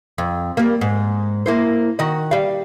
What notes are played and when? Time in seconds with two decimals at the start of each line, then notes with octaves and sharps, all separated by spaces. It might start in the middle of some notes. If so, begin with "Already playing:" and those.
0.18 F2
0.57 G3 A#3
0.81 G#2
1.46 A#3 E4 C5
1.99 D#3 F#4 D#5
2.31 G3 F5